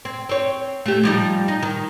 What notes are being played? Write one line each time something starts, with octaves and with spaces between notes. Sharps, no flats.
C4
C4 C#5
A3 G4
F3 G3 D#4
D#4
D#3